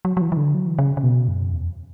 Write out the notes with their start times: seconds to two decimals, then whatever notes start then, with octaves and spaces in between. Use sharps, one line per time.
0.05 F#3
0.17 F#3
0.21 E3
0.32 E3
0.37 D3
0.54 F#3
0.67 E3
0.79 C#3
0.97 C#3
1.03 B2
1.28 F#2
1.52 E2